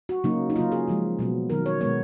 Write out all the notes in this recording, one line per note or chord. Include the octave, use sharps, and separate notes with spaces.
F#4
C#3 F#3 A#3 D#4
D#4
C#3 F#3 A#3 F4
G#4
C#3 F3 G#3
B2 F#3 B3
D#3 F#3 B3 A#4
C#5
B2 G#3 B3 C#5